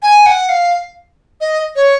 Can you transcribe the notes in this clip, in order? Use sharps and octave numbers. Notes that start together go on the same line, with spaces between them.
G#5
F#5
F5
D#5
C#5